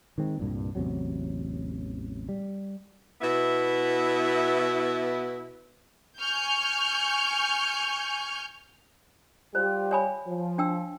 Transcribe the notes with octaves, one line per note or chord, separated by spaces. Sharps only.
D#3 G#3 C4
C2 G2 A#2
A1 E2 C3 F#3
G3
B2 B3 E4
G#5 C#6 F6 G6
G3 F4 G4 C5
C#5 G#5 B5
F3
D4 G5 E6